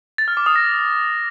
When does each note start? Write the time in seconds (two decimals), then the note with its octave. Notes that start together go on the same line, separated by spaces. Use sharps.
0.18 A6
0.28 F6
0.37 D6
0.46 D#6
0.56 A#6